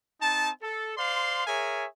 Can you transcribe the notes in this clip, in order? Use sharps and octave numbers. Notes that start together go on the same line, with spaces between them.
C4 D#4 A5
A4
C5 D5 F5 C6
G#4 A#4 C#5 E5 G#5